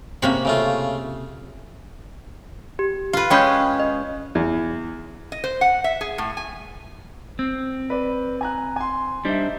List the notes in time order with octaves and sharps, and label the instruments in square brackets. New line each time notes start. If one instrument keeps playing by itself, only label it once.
[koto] C3 A#3 C#4 [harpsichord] B5
[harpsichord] C#3 A3 F4
[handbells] G4
[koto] F4 B4
[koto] G#3 C#4 G#4 [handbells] G5 B5 G6
[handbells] D#5
[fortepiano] E2
[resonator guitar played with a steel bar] D#5
C5
F#5
E5
G#4
A2
G#5
[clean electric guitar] C4
[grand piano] B4 D5
G#5 A#5 F#6
G#5 C6
[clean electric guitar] G3 D4 C5 [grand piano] D#4 E5